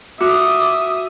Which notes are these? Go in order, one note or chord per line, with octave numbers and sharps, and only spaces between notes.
F#4 E5 D6 D#6